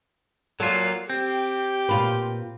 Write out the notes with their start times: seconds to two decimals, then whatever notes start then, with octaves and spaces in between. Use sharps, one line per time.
0.60 A#2 F#3 F4 A4
1.10 C4 G4
1.89 A#2 F4 B4